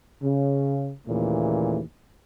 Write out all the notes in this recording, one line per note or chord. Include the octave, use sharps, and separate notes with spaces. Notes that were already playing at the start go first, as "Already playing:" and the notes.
C#3
D#2 A#2 C#3 E3 A3